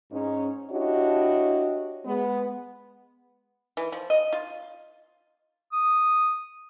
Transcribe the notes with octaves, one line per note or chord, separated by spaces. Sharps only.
G#2 C#4 D#4
D4 E4 F#4 G4 C#5 D#5
G#3 B3
E3
F3
D#5
F4
D#6